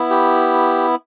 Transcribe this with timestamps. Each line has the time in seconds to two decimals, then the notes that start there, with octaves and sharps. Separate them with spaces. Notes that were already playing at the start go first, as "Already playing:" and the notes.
Already playing: B3 E4
0.10 G4